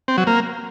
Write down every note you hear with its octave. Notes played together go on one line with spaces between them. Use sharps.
C4
F#3
A#3